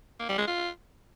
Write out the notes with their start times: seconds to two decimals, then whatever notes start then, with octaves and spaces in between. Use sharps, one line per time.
0.20 A#3
0.29 G3
0.38 G#3
0.48 F4